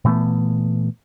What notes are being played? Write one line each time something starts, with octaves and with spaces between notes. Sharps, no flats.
A#2 E3 A3 B3